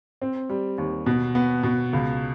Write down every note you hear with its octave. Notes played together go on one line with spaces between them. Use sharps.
C4
G3
D#2
B2
B3
B2
C#2